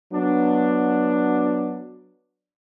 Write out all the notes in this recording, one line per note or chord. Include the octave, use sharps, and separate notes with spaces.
F#3 B3 D4